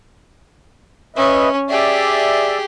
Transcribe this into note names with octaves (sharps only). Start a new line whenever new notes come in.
C#4 B4 D#5 E5
G4 G#4 D5 E5